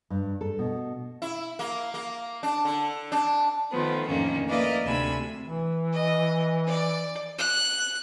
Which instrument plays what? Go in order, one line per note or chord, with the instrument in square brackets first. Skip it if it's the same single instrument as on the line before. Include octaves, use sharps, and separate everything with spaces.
[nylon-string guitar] G2
A4
B2
[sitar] E4
A#3
A#3
D4
D3
D4
[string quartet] D#3 F3 A3 B3
F2 A2 D3 D#3 A#3 C#4
A#3 E4 B4 D5 D#5 F5
D2 C3 D4 G#5 B5 E6
[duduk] E3
[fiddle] D#5
D5
F#6